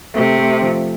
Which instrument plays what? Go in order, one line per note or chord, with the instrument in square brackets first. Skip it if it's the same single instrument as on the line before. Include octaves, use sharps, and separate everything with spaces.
[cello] C3 [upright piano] A3
[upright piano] A3
F3